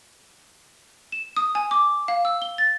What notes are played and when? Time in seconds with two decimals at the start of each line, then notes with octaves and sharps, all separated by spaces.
1.12 E7
1.36 D#6
1.55 G#5
1.71 D6
2.08 F5
2.25 E6
2.42 G7
2.58 A6